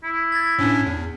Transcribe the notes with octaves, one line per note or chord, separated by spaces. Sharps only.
E4
G#6 A6
A2 C#4 D4
E2